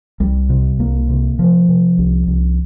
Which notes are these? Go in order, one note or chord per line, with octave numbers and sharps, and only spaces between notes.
C2 G3
C3
C2 A#3
C3
C3 F3
C3
C2
C2